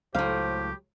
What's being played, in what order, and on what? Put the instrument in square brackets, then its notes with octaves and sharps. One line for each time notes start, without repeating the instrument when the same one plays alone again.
[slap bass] C#2 F#3 [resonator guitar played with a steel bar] A2 F5 [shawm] G4 [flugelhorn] C5